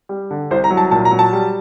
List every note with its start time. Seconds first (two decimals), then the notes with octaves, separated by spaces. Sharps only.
0.09 G3
0.31 D3
0.51 C2 C5
0.64 A#5
0.70 F#3
0.77 A5
0.91 A#2 A5
1.05 A#5
1.11 F#3
1.19 A5
1.33 G3